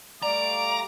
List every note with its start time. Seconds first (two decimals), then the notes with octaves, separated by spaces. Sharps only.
0.22 G3 A3 D5 F5 A#5 D6